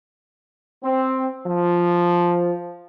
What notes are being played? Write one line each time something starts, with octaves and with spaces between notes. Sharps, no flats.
C4
F3